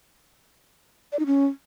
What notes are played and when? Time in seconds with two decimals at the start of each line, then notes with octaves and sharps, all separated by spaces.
1.12 D5
1.19 D#4
1.26 C#4